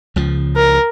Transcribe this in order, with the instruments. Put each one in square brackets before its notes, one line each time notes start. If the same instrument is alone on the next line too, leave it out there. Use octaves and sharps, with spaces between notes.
[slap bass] C#2 C#3 F3
[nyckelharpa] A#4